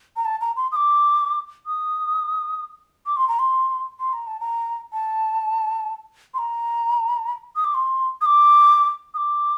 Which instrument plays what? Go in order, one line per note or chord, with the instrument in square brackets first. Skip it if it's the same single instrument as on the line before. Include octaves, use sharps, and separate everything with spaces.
[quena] A#5
A5
A#5
C6
D#6
D6
D#6
D6
C6
A#5
C6
C6
A#5
A5
A#5
A5
C6
A#5
D#6
D6
C6
D#6
D6
D#6
D6